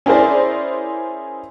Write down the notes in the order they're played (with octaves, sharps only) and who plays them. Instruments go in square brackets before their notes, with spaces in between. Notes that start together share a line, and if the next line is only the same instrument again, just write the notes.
[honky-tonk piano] C#4 E4 G#4 A#4 C5 D5